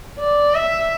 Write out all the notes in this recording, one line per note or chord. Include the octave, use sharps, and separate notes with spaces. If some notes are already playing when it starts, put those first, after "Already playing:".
D5
E5